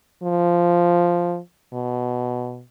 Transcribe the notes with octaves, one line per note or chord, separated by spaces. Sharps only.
F3
B2